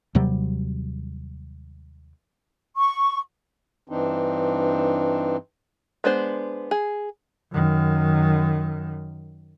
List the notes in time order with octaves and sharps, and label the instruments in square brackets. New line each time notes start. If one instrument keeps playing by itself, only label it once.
[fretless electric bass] D#2 C3 F#3 G3
[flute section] C#6
[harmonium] G2 E3 C4 D4 D#4
[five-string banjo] G#3 B3 D4 C5
G#4
[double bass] F#2 D#3